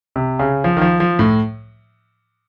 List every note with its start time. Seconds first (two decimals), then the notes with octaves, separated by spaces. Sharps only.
0.16 C3
0.39 C#3
0.64 F3
0.77 D#3
0.81 F3
1.00 F3
1.19 A2